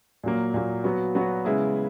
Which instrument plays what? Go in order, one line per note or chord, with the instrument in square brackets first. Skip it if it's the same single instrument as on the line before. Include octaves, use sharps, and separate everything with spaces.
[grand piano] A#2 F#3 A#3
A#2 F#3 A#3
F#3 B3 F#4
F#3 B3 F#4
C#3 G#3 B3 E4 G#4